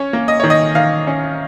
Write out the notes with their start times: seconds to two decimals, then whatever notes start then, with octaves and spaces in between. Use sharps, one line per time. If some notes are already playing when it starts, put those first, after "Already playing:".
Already playing: C#4 C#5
0.13 A#3
0.28 D#5
0.40 D#3 C#5
0.50 D#5
0.75 D#3 F5
1.07 C#4